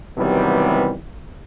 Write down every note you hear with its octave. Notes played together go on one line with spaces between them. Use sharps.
C3 D#3 E3 F#3 G3 B3